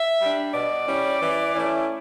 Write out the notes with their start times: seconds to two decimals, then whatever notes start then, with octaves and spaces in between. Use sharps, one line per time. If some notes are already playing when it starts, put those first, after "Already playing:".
Already playing: E5
0.21 G3 D4
0.54 B2 D5
0.87 G3 C#4 E4
1.21 E3
1.54 A3 C#4 E4